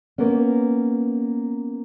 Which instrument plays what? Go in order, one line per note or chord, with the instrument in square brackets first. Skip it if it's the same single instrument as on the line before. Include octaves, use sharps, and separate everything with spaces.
[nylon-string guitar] A#3 B3 C#4